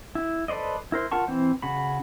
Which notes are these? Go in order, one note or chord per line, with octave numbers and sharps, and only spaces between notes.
E4
A4 B4 C5 D5 D#5
E4 A#4 C5
F4 A#4 F#5 A5 C#6
E3 C4 C5
C#3 F#4 B5